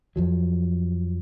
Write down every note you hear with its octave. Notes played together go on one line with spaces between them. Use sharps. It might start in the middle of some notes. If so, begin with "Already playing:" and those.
F2 F3 F#3